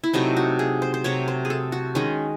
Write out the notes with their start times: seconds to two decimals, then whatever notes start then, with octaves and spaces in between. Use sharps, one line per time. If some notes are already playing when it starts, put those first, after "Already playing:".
0.04 E4
0.13 C3 F#3 A3 D#4
0.37 F#4
0.59 G#4
0.82 C5
0.94 C5
1.04 C3 F#3 A3 C#5
1.28 C5
1.45 G#4
1.50 A4
1.72 F#4
1.95 D#3 G#3 C#4